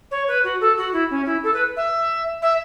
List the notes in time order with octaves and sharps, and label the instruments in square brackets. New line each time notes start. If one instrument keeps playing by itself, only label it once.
[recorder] C#5
B4
F#4
A4
F#4
E4
C#4
E4
A4
B4
E5
E5